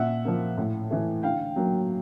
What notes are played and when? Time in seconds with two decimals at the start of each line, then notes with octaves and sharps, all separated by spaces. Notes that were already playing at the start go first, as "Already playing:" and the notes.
Already playing: A#2 E5 F#5
0.25 F3 A#3
0.57 A2
0.90 E3 A3
1.23 D3 F5 G5
1.56 F#3 A#3